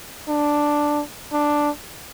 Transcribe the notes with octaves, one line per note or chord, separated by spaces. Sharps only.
D4
D4